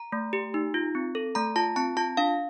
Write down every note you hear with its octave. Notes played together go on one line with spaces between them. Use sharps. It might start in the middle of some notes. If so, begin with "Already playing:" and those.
Already playing: A#5
A3
G4
D#4
F4
C4
A4
A3 A#5
F4 A5
C4 A5
F4 A5
D4 F5